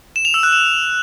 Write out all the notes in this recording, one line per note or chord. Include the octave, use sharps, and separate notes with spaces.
E7
F7
E6
F#6
E7